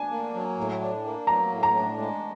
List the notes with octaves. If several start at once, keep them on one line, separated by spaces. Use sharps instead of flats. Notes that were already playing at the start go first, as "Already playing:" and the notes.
Already playing: D4 G#5
A#3
F#3
A2
D4
A#3
F#3 A#5
A2
A#5
D4
G#3